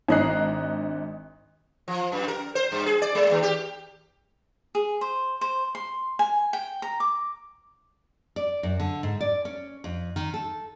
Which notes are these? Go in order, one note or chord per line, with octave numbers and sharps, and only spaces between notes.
G#1 D4 D#5 A#5 F#6 C7
F3
F#2
A#4
C5
G2
G#4
D5
G#3
D#2
G4
G#4
C5
C5
C6
G#5
G5
A#5
D6
D5
F#2
D3
G#2
D5
C#4
F2
D#3
A4